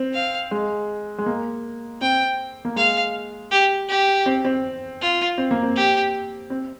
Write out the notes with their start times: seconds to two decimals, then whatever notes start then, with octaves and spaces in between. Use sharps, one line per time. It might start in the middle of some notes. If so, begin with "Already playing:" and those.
Already playing: C4
0.13 F5
0.51 G#3
1.18 G#3
1.26 A#3
2.01 C4 G5
2.65 A#3
2.76 G#3 F5
3.51 G4
3.89 G4
4.26 C4
4.44 C4
5.01 F4
5.38 C4
5.51 A#3
5.63 C4
5.76 G4
6.50 C4